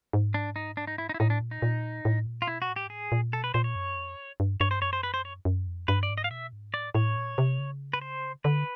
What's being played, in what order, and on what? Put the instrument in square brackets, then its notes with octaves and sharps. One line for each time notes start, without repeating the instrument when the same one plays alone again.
[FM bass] G#2
[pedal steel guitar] D4
D#4
D4
D#4
E4
D#4
E4
[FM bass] A2 [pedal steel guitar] D#4
[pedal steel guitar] D4
[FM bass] A#2
[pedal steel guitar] D#4
[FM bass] A#2
A2
A#2
[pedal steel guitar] F4
[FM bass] B2 [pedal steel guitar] E4
[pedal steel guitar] F#4
[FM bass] A2
[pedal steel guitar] G4
[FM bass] G#2
[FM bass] A2 [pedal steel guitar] G#4
[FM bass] A#2
[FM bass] B2 [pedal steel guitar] A4
[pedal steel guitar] B4
[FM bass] A#2 [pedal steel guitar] C5
[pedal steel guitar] C#5
[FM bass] F#2
F2
G2
[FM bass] G2 [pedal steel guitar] C#5
[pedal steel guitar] C5
[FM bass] F#2 [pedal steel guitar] C#5
[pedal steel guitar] C5
B4
C5
C#5
[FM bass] F#2
F2
[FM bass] G2 [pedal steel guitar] B4
[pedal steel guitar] D5
[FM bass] G#2
[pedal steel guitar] D#5
F5
[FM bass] B2 [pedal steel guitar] E5
[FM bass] G#2
[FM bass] A2 [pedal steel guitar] D5
[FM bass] A2 [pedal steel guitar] C#5
[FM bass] A#2
C3
C#3
[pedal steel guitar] B4
C5
[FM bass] D3 [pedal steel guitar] B4